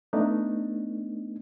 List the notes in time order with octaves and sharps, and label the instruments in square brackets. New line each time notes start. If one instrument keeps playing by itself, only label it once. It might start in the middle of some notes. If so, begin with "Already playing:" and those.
[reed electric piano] A3 B3 D4 D#4